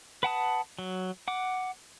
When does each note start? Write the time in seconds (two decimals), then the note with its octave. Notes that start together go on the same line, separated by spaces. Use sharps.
0.23 B4 F#5 A5 D#6
0.79 F#3
1.28 F#5 D6